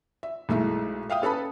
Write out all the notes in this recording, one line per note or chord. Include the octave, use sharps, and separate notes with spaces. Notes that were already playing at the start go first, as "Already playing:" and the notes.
E5
B1 G#3 A3 E4
E5 F5 G5 D#6
C#4 A4 B4 A5 B5